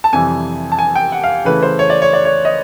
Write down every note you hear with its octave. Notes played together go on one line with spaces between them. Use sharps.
A5
F2 C3 E3 G3 G#5
A5
G#5
G5
F#5
F5
C#3 E3 A3 B4
C5
C#5
D5
C#5
D5
C#5
D#5